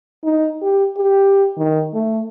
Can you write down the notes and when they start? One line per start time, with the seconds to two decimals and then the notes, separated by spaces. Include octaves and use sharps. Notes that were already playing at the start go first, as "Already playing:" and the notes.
0.24 D#4
0.62 G4
0.98 G4
1.58 D#3
1.94 A3